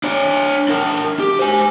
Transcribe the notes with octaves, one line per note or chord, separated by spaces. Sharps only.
D4 C#5
D4 A#4
G4
C5 G#5